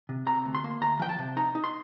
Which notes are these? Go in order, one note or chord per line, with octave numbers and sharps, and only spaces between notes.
C3
C3 A#5
D2
C6
A#3
D2 A#5
F3 G5
A5
C3
D#4 A#5
D#4
C6